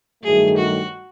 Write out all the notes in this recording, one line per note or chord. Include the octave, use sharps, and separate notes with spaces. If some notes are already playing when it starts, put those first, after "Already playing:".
G2 D#3 F#3 A3 G#4
F#4